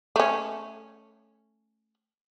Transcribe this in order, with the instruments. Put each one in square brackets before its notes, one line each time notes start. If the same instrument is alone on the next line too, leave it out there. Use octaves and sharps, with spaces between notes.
[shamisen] A3 C#4